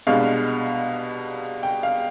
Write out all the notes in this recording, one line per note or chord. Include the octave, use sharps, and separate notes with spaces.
C2 B2 G#3 D4 F5
G5
F5